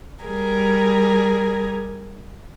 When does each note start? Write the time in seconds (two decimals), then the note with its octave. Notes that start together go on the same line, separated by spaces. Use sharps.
0.23 G3 G#4 A#4